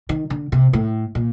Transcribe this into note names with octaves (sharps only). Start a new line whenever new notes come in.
D#3
D3
C3
A2
A#2